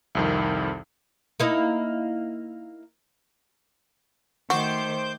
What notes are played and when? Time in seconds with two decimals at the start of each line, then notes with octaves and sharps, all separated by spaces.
0.15 C2 F2 D#3
1.40 A#3 D#4 E4
4.50 D#3 A3 F#4 C5 D6 G6